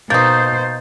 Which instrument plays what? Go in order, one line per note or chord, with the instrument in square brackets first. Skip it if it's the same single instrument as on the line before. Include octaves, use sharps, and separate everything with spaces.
[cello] B2 C5 [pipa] A#3 D#4 [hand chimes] G6 A6